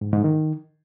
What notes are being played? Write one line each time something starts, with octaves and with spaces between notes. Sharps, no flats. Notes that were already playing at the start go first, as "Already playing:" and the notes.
G#2
G#2
D#3